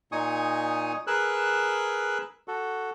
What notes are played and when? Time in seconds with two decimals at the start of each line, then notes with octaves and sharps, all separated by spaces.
0.12 A#2 D#4 G#5 C#6 D#6
1.07 G#4 A#4 B4 E6 F#6
2.48 F#4 A4